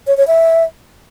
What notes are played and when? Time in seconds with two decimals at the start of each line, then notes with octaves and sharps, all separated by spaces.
0.07 C#5
0.17 C#5
0.27 E5